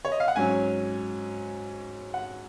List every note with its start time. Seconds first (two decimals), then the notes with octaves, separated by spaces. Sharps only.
0.05 C#5
0.12 D#5
0.20 F5
0.28 F#5
0.36 G#2 F#3 C#4 G#5
2.14 F#5